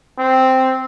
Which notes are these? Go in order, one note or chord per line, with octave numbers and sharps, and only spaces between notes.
C4